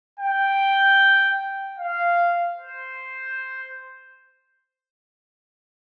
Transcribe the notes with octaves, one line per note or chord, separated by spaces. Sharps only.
G5
F5
C5